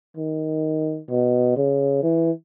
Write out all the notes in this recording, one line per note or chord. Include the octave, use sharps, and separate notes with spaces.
D#3
B2
C#3
E3